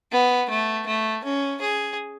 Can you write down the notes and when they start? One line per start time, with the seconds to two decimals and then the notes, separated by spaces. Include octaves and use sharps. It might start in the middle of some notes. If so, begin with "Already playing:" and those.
0.12 B3
0.50 A3
0.87 A3
1.25 C#4
1.61 G#4